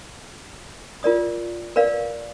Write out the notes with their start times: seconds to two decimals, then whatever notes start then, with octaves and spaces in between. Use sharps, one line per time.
1.03 F4 A#4 D5 D#6
1.76 A#4 B4 D5 F5